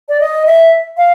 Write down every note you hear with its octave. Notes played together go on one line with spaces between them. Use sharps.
D5
D#5
E5
F5